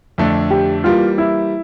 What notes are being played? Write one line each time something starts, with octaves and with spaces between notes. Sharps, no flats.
F2 D3 A3 D4
G4
E3 G3 A#3 F4
E4